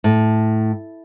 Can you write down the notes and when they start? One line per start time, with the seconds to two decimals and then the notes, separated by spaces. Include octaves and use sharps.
0.04 A2